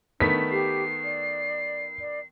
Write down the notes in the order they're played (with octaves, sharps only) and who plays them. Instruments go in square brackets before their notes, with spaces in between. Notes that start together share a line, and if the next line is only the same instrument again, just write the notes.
[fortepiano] D#3 A3 B3 [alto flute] D4 [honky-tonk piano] B6
[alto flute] G4 [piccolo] C7
[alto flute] D5
D5